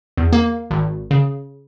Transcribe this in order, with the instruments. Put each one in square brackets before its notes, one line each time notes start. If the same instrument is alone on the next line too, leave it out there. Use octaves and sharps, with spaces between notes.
[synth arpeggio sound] E2
A#3
G#1
C#3